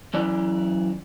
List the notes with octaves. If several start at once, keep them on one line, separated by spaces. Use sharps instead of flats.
F#2 E3 D5